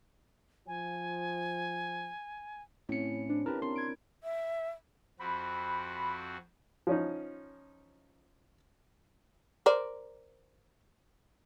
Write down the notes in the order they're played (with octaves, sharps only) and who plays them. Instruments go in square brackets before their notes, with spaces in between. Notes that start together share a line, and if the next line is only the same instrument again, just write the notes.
[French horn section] F3 [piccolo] G#5
[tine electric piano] A2 C#7 [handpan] C4 C#4 E4
[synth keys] D4 [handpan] C5
[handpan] C#4 E4 [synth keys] G4 A5 [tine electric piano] A#4 B4
[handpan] C4 D4 A#4 [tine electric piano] C6
[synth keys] G#6 D7
[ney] E5
[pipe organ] F2 C4 F#4 [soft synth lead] B5
[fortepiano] F3 C#4 D#4
[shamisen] A#4 C5 D5